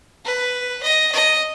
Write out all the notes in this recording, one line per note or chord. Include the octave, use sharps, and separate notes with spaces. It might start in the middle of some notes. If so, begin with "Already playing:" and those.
B4
D#5
D#5